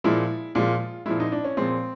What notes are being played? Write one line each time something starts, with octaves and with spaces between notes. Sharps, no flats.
A#2 F3 G#3 E4
A#2 F3 G#3 F4
A#2 F3 G#3 E4
D#4
D4
C#4
A#2 F3 G#3 C4